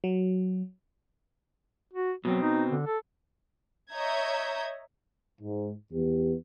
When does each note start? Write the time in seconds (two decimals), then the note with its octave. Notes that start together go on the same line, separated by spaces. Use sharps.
0.04 F#3
1.93 F#4
2.25 B2 F#3 C4
2.42 D#4
2.70 D3
2.86 A4
3.91 C#5 D#5 E5 A#5 G6 G#6
5.40 G#2
5.92 E2 B3 G4